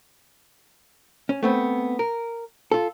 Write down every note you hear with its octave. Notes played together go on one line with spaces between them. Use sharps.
C#4
A3 B3 C4
A#4
F4 A4